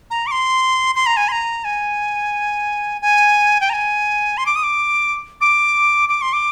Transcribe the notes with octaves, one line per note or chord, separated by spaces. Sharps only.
A#5
D6
C6
C6
A#5
G#5
C6
A#5
G#5
G#5
G5
A#5
G#5
C6
D6
D#6
D6
D6
D6
C6
D6